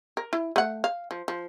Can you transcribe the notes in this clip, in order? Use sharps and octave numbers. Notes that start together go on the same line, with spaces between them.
A#4
E4
A3 F#5
F5
F3
F3